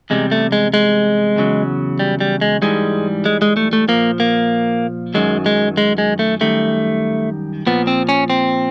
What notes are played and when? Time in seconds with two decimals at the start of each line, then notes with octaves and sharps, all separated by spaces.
0.10 E2 C3 E3 G3 G#3
0.31 A3
0.52 G#3
0.74 G#3
1.36 E2 C#3 F#3
1.99 G3
2.20 G3
2.41 G#3
2.62 G#2 E3 G3 G#3
3.26 G#3
3.42 G#3
3.57 A3
3.73 A3
3.88 A#2 F3 A#3
4.20 A#3
5.14 F#2 D#3 F#3 G#3
5.46 G#3
5.77 G#3
5.98 G#3
6.19 A3
6.41 F#2 D#3 G3 A3
7.67 A#2 F3 B3
7.87 C4
8.09 C#4
8.30 C4